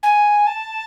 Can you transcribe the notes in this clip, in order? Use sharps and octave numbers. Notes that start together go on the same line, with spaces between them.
G#5
A5